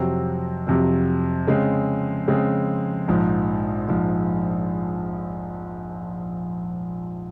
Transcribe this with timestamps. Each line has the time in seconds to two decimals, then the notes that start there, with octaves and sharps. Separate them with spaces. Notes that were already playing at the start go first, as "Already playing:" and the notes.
Already playing: F2 C3 F#3 C4
0.67 F2 C3 F#3 C4
1.47 C#3 G#3 C4
2.28 C#3 G#3 C4
3.08 A#1 G#2 F3
3.89 A#1 G#2 F3